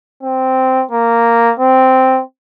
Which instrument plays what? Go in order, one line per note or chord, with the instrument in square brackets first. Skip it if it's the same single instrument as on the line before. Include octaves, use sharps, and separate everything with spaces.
[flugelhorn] C4
A#3
C4